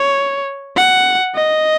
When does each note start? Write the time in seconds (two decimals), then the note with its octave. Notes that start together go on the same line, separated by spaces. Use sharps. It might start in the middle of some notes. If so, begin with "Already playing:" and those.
Already playing: C#5
0.76 F#5
1.35 D#5